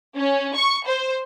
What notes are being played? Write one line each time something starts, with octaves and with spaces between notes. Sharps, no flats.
C#4
C#6
C5